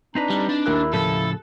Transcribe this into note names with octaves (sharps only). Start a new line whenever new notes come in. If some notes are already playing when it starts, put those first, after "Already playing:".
C4 D4 D#4 B4 A#5
G3
D4
D#2 E4 A#4 F#6
A2 C#3 F3 A4